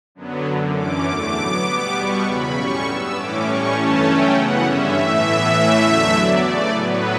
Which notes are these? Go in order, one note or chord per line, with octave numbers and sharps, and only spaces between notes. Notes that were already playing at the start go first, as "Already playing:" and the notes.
F#2 D3 F#3 B3
F#2 D3 F#3
F#2 E3 A3 C#4 D6
E2 D3 A3 D6
A2 F#3 B3 D6
B2 G3 B3 D6
E2 B2 G3 B3 C#6
E2 C#3 F#3 B5
A2 G3 C#4 C#6
G2 F#3 B3 E6
A2 E3 A3 C#4 D6
A2 G3 C#4 C#6
G2 E3 A3 C#4 A5
C#3 F#3 A3 C#4 G5
F#2 C#3 E3 B3 F#5
G2 D3 G3 C#4 E5
A2 E3 A3
A2 E3 B3 E5
A2 E3 A3 C#4
E2 D3 F#3 A3
G2 D3 F#3 B3 D5
C#3 E3 A3 D5
A2 F#3 B3 B4